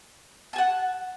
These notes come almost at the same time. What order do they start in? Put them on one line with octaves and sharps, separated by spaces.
A5 G#5 F#5